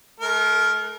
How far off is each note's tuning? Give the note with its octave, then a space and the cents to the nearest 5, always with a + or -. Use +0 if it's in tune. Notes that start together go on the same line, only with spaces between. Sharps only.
A3 -40 A#4 +0